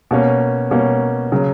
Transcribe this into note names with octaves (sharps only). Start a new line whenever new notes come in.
B2 A#3 C#4
B2 A#3 C#4
C#3 F#3